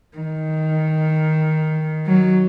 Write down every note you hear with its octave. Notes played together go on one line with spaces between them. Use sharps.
D#3
F#3